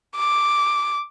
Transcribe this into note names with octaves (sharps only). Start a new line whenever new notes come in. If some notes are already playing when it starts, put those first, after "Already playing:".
D6